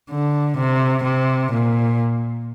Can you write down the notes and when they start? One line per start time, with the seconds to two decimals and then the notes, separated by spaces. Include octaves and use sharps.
0.10 D3
0.57 C3
1.03 C3
1.52 A#2